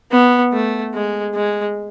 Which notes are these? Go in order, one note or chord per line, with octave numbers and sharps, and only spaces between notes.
B3
A3
G#3
G#3